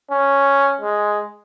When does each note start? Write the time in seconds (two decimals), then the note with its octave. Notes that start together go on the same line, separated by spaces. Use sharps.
0.11 C#4
0.81 G#3